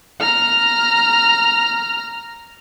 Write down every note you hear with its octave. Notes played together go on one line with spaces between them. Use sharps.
A#5 F6